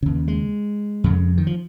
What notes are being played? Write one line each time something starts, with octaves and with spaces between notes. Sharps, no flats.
D#2 C#3
G#3
F2 C#3
D#3
F3